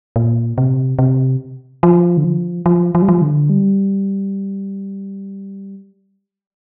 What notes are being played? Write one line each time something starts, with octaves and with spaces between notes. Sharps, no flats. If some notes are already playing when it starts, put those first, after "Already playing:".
A#2
C3
C3
F3
D3
F3
F3
F3
G3
F3
D3
G3